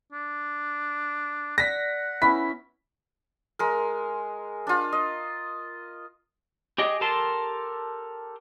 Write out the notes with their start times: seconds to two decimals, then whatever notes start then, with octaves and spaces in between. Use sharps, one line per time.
0.12 D4
1.58 D5 F#5 A#6 B6
2.22 B3 C#4 E4 B6
3.59 G#3 A#4
4.67 D4 F4
4.92 D#5
6.78 G4 G#4 D#5 G5
7.01 G4 A4 A#4 A5 C6